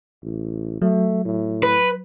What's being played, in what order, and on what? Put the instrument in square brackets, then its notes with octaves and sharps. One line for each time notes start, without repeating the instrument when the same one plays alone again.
[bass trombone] A1
[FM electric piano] F#3 [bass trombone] A3
[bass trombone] A2
[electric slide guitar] B4